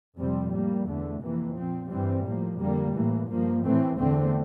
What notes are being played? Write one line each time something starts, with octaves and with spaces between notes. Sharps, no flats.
F2 C3 G3 C4
A2 G3 A#3
E2 D3 A3
F2 C3 E3 A#3
A#2 F3 C4
G2 E3 G3 C4
A2 F3 A#3
F2 D3 G3 A#3
A2 E3 A#3
G2 F3 A#3
A2 E3 A3 C4
E2 D3 A3 C4